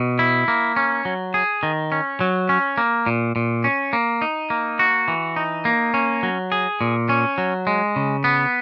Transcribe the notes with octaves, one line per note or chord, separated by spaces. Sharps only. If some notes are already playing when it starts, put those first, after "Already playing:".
Already playing: B2
E4
A#3
C#4
F#3
G#4
D#3
C#4
F#3
C#4
A#3
A#2
A#2
C#4
A#3
D#4
A#3
F#4
E3
D#4
A#3
C#4
F#3
G#4
A#2
C#4
F#3
G#3
C#3
B3